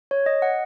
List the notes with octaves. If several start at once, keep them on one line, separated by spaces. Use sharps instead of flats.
C#5
D#5
F#5